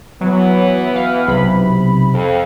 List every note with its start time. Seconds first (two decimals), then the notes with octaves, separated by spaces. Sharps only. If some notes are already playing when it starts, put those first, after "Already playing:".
0.21 E3 F#3 B3
0.96 F5
1.27 B1 C3 B5
2.14 F2